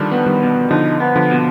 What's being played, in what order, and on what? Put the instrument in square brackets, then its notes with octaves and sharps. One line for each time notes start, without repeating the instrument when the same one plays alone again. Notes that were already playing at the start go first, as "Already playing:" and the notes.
Already playing: [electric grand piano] D3 D#3 F3 G3 [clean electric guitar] D4
[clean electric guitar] B3
[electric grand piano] D#3 G3
[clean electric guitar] B2
[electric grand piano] D3 F3 [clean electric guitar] D#4
[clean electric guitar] B3
[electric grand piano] D3 F3
[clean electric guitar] B2